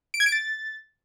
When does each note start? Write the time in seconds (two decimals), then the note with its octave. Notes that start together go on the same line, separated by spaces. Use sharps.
0.14 D7
0.20 G#6
0.26 D7
0.32 A6